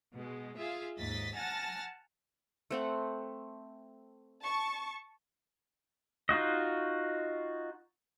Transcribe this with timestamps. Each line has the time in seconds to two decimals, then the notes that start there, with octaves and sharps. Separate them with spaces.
0.12 B2 G#3
0.57 F4 G#4 E5 F5
0.99 D#2 G#2 D#5 A6 B6
1.35 F#5 G#5 A5 F6 A6 A#6
2.71 A3 C4 F#5
4.42 A5 C#6
6.29 D#4 F4 F#4 D#5